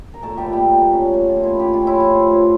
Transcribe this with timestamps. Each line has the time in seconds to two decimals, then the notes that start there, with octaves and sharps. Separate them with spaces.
0.14 A#4
0.23 A#2 A3 A4
0.37 G3 G4
0.46 A#2
0.53 G3 G4
0.68 A#2
0.91 C#4
1.13 A3
1.29 F4
1.36 A#2
1.44 E4
1.59 C#4 G4
1.73 F4
1.82 C#4
1.87 E4
2.00 F3 F4
2.27 A2